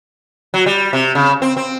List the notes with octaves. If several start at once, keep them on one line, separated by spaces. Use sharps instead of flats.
F#3
G3
C3
C#3
C4
C4